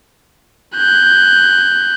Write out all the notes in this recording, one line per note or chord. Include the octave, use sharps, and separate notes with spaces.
F#6 G6